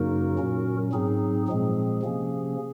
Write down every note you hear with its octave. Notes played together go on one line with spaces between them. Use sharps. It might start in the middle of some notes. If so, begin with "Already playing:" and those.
Already playing: F#2 C#3 F#3 A#3 D#4 F#4 A#4
A#2 F#3 C#4
G#2 F#3 C4 D#4 G#4
A#2 F3 G#3 C4 G#4
C3 F3 A#3 C#4